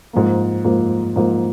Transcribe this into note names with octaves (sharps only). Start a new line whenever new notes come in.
G#2 F3 A#3
G#2 F3 A#3
G#2 F3 A#3